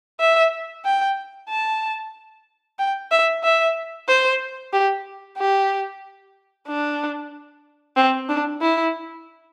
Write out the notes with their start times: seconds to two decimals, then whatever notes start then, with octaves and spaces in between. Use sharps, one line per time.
0.20 E5
0.85 G5
1.49 A5
2.79 G5
3.11 E5
3.44 E5
4.08 C5
4.73 G4
5.38 G4
6.67 D4
7.96 C4
8.29 D4
8.61 E4